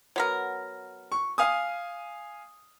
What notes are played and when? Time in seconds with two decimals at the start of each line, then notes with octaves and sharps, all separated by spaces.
0.16 F#3 B3 A#4
1.12 C#6
1.38 F5 G#5 D#6